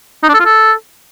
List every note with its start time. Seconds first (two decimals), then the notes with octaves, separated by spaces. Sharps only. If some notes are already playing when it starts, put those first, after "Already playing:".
0.23 D#4
0.29 D4
0.34 A4
0.40 F4
0.45 A4